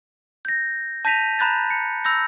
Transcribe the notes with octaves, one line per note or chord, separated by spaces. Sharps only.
G6 A#6
A5 G6 A#6 B6 D#7 F7
A#5 B5 F#6 G6 A6
C#7
B5 E6 G6 A#6